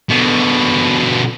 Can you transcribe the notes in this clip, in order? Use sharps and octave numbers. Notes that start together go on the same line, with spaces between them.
B2 D3